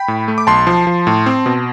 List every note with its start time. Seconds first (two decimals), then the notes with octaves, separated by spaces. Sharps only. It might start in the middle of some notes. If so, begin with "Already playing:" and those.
Already playing: G5 B5
0.08 A2
0.28 A3
0.38 D6
0.47 B1 A5 C6
0.67 F3
0.87 F3
1.07 A2
1.26 C4
1.46 B2